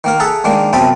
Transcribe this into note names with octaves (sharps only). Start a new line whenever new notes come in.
D#3 A#3 A#4
G#4 A4 E5 F#5 A5 A#5
D#3 G#3 A#3 D4
F#2 C3 B3 C4 A5 B5